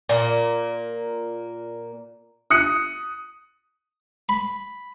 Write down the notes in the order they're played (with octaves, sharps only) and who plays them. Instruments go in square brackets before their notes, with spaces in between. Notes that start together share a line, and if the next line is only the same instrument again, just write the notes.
[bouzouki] A#2 A#3
[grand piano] D#6 F#6 C#7
[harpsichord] B5